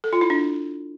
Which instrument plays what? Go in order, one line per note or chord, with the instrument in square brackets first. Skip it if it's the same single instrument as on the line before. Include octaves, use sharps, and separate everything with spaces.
[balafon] A4
F4
E4
D4